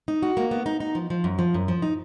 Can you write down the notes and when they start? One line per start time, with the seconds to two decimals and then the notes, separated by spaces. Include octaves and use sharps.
0.08 D#4
0.22 F#4
0.37 A#3
0.51 B3
0.66 D#4
0.80 D#4
0.95 F3
1.10 F3
1.24 F#2
1.39 F3
1.54 F#2
1.68 F3
1.82 D#4